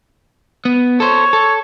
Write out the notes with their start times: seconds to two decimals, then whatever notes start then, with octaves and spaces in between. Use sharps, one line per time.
0.65 B3
1.00 A4 C5 C#5
1.33 A4